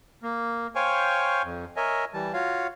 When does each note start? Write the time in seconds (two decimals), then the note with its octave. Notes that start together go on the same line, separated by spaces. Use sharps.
0.23 A#3
0.75 C5 C#5 F5 G5 G#5 C#6
1.43 F2
1.76 A#4 C#5 D#5 E5 G#5
2.14 E3 G3 A5
2.33 F4 F#4 C#5 F5